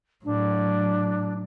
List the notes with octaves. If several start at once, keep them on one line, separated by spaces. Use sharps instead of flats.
A2 F#3 D4